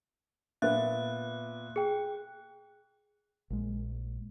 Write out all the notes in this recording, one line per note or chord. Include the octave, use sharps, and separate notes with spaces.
A#2 B3 E5 F#6
G#4 G5
A#1 G#3